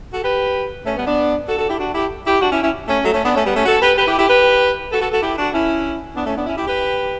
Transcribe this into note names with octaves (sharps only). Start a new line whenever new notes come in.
F#4 A4
G4 B4
A3 C#4
G3 B3
B3 D4
F#4 A4
F#4 A4
E4 G4
D4 F#4
E4 G4
E4 G4
D4 F#4
C#4 E4
C#4 E4
A3 C#4
F#3 A3
A3 C#4
B3 D4
A3 C#4
G3 B3
A3 C#4
F#4 A4
G4 B4
G4 B4
E4 G4
E4 G4
G4 B4
F#4 A4
F#4 A4
F#4 A4
E4 G4
D4 F#4
C#4 E4
B3 D4
A3 C#4
B3 D4
C#4 E4
E4 G4
G4 B4